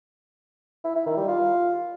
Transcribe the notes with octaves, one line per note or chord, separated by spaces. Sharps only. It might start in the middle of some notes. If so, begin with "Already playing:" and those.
E4
E4
D#3
G3
F4